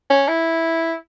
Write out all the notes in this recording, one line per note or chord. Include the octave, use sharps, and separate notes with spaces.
C#4
E4